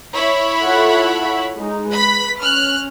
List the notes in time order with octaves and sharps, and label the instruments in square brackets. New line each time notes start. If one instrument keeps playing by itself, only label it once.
[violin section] E4 C#5 B5
[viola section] F4 A4 F#5
G#3 D#4
[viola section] B4 [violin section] B5 B6
[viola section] C#4 [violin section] F6 F#6